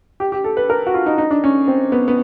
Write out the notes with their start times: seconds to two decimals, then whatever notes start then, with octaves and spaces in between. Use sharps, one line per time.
0.20 G4
0.32 G4
0.44 A4
0.57 B4
0.70 A#4
0.87 F#4
0.94 F4
1.06 D#4
1.18 D#4
1.31 D4
1.44 C#4
1.68 C4
1.92 B3
2.08 B3